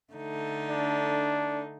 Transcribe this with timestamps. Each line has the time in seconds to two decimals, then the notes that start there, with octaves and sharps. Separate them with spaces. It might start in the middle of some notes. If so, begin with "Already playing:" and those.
0.13 D3 A3 D#4
0.70 D4